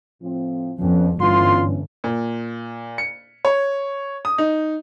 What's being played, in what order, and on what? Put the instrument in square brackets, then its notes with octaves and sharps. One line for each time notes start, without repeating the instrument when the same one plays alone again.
[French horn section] A2 F3 C4
[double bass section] F2 [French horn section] B3 C#4
[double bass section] G1 [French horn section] E3 C#4 D4 [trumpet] F4 [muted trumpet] C6
[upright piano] A#2
C#7
C#5
D#6
D#4